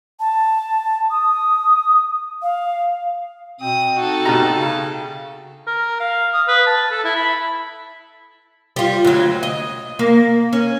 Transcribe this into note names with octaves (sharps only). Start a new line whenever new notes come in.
A5
D#6
F5
B2 C4 D#6
D#4 F#4 A4
B2 G4 A#5
C#3
A#4
F5
D#6
B4
A5
A4
E4
B5
G3 F4
D2 F#3
D#5
A#3
C#4